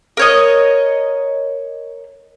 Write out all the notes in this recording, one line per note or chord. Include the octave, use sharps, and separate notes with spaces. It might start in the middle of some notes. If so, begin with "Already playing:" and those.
A#4 C#5 D#5